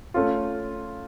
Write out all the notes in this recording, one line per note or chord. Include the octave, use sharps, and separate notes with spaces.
A3 C#4 F4